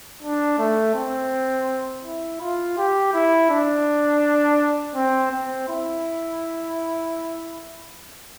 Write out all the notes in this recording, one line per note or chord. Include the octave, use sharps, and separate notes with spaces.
D4
A3
C4
E4
F4
G4
E4
D4
C4
C4
E4